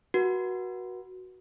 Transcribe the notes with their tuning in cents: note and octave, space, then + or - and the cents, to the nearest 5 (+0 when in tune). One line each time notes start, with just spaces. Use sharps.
F#4 +0 B4 -40